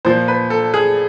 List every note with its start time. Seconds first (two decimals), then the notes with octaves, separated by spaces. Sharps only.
0.05 A#2 F3 C5
0.28 B4
0.50 A4
0.74 G#4